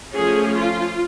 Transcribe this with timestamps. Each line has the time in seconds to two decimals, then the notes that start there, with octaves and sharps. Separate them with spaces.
0.14 F3 A3 C#4 G#4
0.55 F4